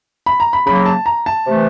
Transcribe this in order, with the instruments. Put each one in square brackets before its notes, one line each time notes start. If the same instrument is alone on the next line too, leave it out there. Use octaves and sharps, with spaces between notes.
[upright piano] B5
A#5
B5
[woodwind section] C#3 F#3 A#3 [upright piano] B5
[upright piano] A5
A#5
A5
[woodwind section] C3 E3 A3